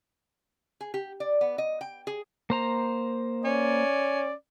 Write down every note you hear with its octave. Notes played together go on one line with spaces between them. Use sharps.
G#4
G4
D5
B3
D#5
G5
G#4
A#3 C5 A#5
C#4 D5